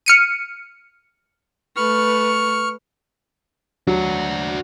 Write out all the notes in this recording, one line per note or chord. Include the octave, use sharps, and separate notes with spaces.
F6 C#7 D#7
A3 B4 C#6 F6
F#3 D4 F#4